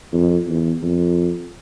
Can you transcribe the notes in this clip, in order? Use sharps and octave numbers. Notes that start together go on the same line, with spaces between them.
F2
E2
F2